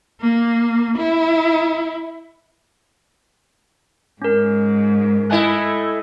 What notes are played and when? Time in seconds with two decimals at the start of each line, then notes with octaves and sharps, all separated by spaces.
0.20 A#3
0.97 E4
4.22 G#2 C#4 A#4
5.30 A3 E4 D#5 G#5 F#6